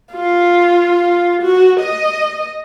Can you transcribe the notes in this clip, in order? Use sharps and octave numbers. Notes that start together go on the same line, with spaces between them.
F4
F#4
D#5